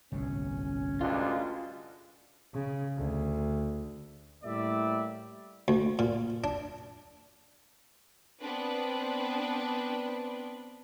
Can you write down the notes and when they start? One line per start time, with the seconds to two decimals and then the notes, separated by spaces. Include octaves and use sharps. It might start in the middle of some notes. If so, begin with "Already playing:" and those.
0.12 G1 C2 A2 C#4
1.01 D2 G2 G#3 F4
2.54 C#3
2.98 D2
4.44 A2 G3 A#3 D5 E5
5.68 D2
5.99 A#2
6.44 D4
8.39 B3 C4 D4 B4